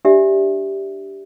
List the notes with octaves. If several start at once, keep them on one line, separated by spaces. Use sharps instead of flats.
D4 G4 D5 E5